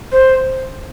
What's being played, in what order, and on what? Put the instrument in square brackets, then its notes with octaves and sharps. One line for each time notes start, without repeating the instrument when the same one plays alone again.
[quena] C5